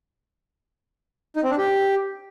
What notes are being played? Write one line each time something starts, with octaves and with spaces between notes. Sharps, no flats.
D#4
C4
D4
G4